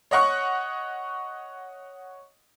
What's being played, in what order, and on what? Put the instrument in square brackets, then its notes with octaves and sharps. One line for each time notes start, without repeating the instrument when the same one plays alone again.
[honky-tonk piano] C#5 D#5 F#5 C#6